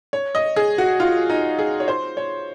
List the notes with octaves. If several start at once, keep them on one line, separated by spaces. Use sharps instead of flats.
C#5
D#5
G#4
F#4
F4
D#4
G#4
C#5
C5
C#5